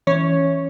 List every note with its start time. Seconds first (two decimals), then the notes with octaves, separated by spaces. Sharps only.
0.07 E3 C#4 C#5